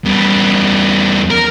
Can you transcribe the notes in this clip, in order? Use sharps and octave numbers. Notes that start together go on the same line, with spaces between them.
E2 G3
A#4